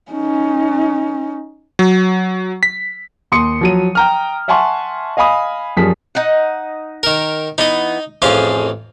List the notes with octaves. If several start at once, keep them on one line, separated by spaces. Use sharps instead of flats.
C#4 D#4
F#3
B6
D#2 C6 D#6 C#7
F3 F#3 D#7
G5 A#5 F6
E5 F#5 G#5 A5 C6 C#6
D#5 F5 G#5 B5 D#6
F#2 F3 G3 G#4 B6
D#4 F#5
D#3 A#4
E3 B3 D#4 D#5
A1 F2 F3 F4 G#4